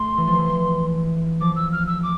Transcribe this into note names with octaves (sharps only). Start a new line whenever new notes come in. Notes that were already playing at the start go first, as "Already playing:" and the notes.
Already playing: A3 C6
E3
F3
E3
F3 D6
E6
F6
E6
D6